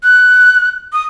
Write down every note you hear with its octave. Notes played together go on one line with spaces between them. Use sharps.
F#6
D#6